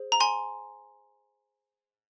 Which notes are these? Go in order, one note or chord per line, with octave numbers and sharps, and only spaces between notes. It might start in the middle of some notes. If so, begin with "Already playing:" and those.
Already playing: G#4 C5
A#5
G#5 C6